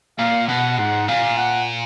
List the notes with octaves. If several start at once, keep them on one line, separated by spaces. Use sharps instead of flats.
A#2 F5
B2 F#5
G#2 F#5
A#2 F5
F#5